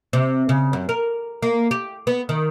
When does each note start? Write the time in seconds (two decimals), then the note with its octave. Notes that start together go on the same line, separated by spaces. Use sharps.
0.13 C3
0.49 C#3
0.73 F#2
0.89 A#4
1.42 A#3
1.71 G4
2.07 B3
2.29 D#3